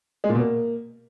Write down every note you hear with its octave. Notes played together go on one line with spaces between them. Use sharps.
G#3
A#2
B2
A#3